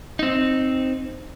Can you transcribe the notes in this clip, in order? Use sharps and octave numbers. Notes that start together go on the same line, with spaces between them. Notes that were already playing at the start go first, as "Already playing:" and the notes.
C4 D#4